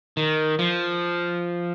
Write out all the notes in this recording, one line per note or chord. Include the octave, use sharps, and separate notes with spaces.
D#3
F3